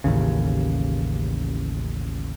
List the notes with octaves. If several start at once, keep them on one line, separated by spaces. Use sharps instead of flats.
A1 D#2 C#3